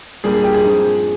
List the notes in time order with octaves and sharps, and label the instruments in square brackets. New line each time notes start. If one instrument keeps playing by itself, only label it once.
[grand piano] A#2 G3 A#3 D4 G#4
G#4
G4
G#4
G2 F3 C4 D#4